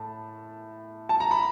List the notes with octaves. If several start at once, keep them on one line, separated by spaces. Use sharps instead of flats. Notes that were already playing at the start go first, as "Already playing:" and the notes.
Already playing: A2 A5
A5
A#5
B5